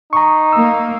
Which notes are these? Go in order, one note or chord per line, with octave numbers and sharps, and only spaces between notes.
D#4 A#5 C#6
A#3 E6